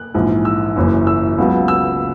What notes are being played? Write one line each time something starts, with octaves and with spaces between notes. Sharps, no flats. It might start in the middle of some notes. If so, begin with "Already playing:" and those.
Already playing: F#6
A#1 G#2 E3
E6
F#1 F#2 E3
E6
C#2 C#3 F#3 B3
E6